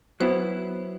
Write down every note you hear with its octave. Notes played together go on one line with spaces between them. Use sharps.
F#3 B3 E4 C5